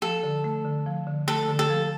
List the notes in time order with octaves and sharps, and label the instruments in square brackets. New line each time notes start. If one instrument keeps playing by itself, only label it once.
[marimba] F3 [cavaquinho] A4
[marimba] D3
A3
D3
F3
D3
[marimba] A3 [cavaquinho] A4
[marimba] D3
[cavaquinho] A4
[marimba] F3